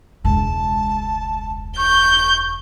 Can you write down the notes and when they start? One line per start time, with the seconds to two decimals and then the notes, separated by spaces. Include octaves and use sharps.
0.24 E1 C#2 A5
1.77 C#6 G6